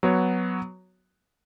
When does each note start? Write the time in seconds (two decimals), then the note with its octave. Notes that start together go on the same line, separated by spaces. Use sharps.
0.03 F#3 B3 F#4 C#5